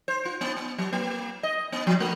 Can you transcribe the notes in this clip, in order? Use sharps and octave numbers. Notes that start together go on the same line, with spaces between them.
C5
F4
B3
B3
F#3
A#3
D#5
B3
F3
A3